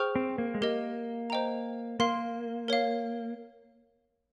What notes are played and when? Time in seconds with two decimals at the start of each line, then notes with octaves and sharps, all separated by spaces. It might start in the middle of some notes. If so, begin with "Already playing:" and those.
Already playing: G#4 C5 G5 C#6 F6
0.16 C4
0.38 A#3
0.54 G#3
0.61 A#3 G4 A#4 D#5
1.30 C5 D#5 G5 A#5
2.00 A#3 A#4 F5 C6
2.68 A#4 C#5 F5